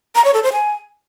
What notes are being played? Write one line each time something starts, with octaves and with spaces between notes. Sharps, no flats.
A#5
C#5
A4
C5
G#5